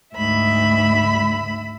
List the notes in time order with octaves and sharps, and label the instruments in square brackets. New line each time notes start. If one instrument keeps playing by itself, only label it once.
[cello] D2 G#2 [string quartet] E5 B5